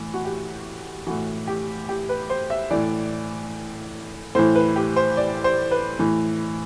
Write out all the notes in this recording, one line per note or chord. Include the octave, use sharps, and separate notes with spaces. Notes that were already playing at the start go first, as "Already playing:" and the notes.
Already playing: A2 E3
F#4
G4
A2 E3 F#4
G4
G4
B4
C5
E5
A2 E3 D5
A2 E3 C5
B4
G4
C5
D5
C5
B4
A2 E3